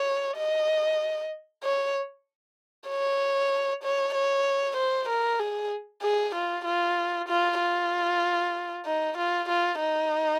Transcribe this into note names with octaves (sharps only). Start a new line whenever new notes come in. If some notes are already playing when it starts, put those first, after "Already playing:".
Already playing: C#5
D#5
C#5
C#5
C#5
C#5
C5
A#4
G#4
G#4
F4
F4
F4
F4
D#4
F4
F4
D#4